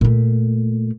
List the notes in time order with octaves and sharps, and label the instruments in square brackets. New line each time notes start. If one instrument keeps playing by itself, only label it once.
[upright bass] A#2 A3